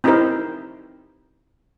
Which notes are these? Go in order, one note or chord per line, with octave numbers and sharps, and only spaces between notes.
C4 D#4 E4 G4 A#4 C5